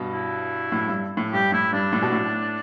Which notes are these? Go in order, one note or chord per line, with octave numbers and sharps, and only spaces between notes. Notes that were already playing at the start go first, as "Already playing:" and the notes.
Already playing: G2 B2
E4
A2
G2
A2
G2 G4
A2 E4
G2 D4
A2
B2
A2